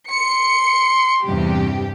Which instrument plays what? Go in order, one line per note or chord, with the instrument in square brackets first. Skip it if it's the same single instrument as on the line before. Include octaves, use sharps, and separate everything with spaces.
[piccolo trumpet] C6 [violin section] C#7
[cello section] E2 G2 C3 [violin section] G4